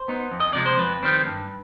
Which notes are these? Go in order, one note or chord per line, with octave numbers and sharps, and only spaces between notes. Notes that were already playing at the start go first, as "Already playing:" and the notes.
Already playing: C5
B3 D#4
F2
D#5
C3 F3 G#3 D5
C5
F2 B4
D#3 G3 C4
G2